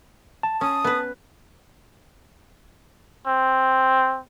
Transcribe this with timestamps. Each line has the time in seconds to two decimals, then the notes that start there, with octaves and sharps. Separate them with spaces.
0.43 A5
0.61 C#4 D#6
0.84 B3 B4
3.27 C4